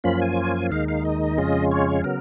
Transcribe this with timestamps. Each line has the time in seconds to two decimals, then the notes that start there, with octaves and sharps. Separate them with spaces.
0.04 F#2 F3 A#3 C#4 F4 B5
0.22 G#5
0.71 D#2 D#3 G#3 D#4 F5
0.88 F5
1.05 D#5
1.37 F2 C#3 G#3 C#4 F4
1.71 C#5
2.04 C#3 F#3 B3 A#4